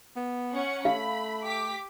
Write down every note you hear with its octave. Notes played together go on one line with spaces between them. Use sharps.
B3
C#4 F#5 C#7
A3 F5 B5
G4 D6 B6